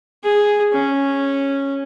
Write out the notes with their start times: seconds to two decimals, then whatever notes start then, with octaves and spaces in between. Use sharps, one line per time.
0.24 G#4
0.73 C#4